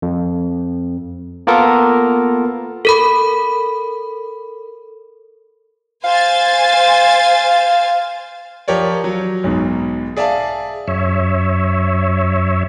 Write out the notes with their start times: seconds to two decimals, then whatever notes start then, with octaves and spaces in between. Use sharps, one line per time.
0.02 F2
1.47 A#3 B3 F4 A4 A#4
2.85 A4 A#4 B5
6.04 C5 F5 G#5 A6
8.68 F3 G4 A#4 C#5 D5
9.04 F#3
9.44 B1 G#2 B2
10.17 G#4 D5 E5 F5 A5
10.88 F#2 C#5 E5